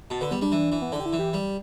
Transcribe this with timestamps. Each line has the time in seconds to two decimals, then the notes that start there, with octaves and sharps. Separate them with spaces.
0.10 B2 A5
0.21 D3 B4
0.31 G3 B3
0.41 G3 D4
0.52 E3
0.72 E3
0.82 B3
0.92 D3 D4
1.00 G4
1.06 E4
1.13 E3
1.19 G4
1.33 G3